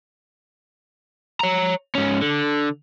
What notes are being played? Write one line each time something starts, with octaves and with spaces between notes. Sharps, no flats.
C#5 A#5
G#2 C#4
D3